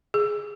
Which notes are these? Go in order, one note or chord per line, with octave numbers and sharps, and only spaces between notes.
G#4